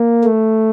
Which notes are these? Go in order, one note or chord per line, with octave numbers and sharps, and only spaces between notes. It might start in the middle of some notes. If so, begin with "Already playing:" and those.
Already playing: A#3
A3